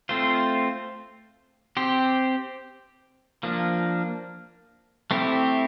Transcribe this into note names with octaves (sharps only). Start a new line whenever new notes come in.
A3 C4 F4 C5
C4 G4 C5
F3 A#3 D4
A3 C4 E4 G4